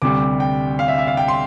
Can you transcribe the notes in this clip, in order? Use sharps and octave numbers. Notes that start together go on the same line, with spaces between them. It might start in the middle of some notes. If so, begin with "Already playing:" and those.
D2 C3 G3 D6
G5
F5
E5
E5
F5
G5
C6